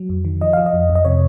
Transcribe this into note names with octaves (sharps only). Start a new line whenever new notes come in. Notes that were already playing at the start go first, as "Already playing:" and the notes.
Already playing: F#3
F2
D#3
F3 D#5
F3 F5
D#5
F2
F2
D#5
C3 C#5